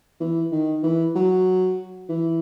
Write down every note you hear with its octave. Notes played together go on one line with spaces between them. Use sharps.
E3
D#3
E3
F#3
E3